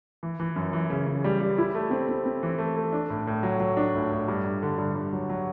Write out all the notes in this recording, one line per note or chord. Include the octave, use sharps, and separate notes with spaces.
E3
E3
F#2
E3
C#3
C#3
G3
G3
E4
A3
C4
C4
C4
E3
A3
A3
D4
A2
A2
F#3
F#3
D4
A2
A2
G2
G2
D3
G2
G2
F#3
F#3